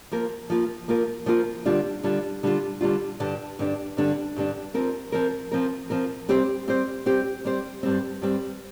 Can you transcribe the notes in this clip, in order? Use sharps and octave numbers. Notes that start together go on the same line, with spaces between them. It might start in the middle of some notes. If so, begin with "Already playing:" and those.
F3 A#3 F4 A#4
F3 A#3 F4 A#4
F3 A#3 F4 A#4
F3 A#3 F4 A#4
D3 G3 D4 F4
D3 G3 D4 F4
D3 G3 D4 F4
D3 G3 D4 F4
G2 D3 G3 D4
G2 D3 G3 D4
G2 D3 G3 D4
G2 D3 G3 D4
F3 C4 A#4
F3 C4 A#4
F3 C4 A#4
F3 C4 A#4
G3 C4 G4 C5
G3 C4 G4 C5
G3 C4 G4 C5
G3 C4 G4 C5
G2 G3 C4
G2 G3 C4